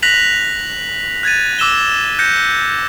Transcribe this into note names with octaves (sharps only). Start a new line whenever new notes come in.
F#6 A#6 B6 F7 F#7
F#6 G#6 A6 D#7
D6 E6 E7 G7
F#6 G6 A#6 C#7